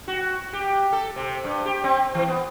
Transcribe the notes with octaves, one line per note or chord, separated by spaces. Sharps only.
F#4
G4
A4
C3
G2
G4
C4
E3
B3